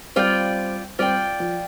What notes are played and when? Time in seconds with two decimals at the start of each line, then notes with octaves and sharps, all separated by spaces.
0.16 G3 C4 F4 D5 G5
0.99 G3 C4 F4 D5 G5
1.40 F3